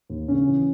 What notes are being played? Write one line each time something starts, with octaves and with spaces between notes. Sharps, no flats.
D#2
C#3 C#4
E3